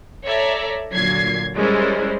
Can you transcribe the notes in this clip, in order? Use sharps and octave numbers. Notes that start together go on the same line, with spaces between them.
A4 C#5 D5 E5 A#5
A#2 D3 F#3 G#6 C7
G3 G#3 C#4 E4 A#4 C5